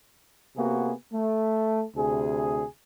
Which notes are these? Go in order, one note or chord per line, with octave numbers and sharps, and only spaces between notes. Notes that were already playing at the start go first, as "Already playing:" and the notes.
C3 A#3 B3 F#4 G#4
A3
D2 C3 G#4